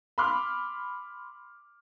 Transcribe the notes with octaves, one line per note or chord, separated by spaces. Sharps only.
B5 C6 D6 F6